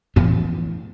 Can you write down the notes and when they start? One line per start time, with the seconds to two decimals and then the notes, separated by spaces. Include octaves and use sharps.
0.16 A2 E3 F3 B3